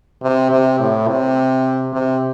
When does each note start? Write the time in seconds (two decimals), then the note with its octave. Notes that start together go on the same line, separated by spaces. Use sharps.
0.22 C3
0.51 C3
0.80 A2
1.08 C3
1.93 C3